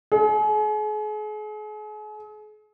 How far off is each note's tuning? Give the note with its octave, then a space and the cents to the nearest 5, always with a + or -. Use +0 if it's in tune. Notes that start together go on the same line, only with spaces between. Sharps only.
G#4 +40